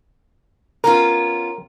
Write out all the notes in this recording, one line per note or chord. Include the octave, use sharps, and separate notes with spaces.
B3 C#4 F4 A#4